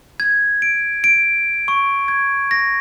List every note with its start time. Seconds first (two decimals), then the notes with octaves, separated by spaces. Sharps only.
0.20 G#6
0.62 D7
1.04 D7
1.68 C#6
2.08 G#6
2.51 A#6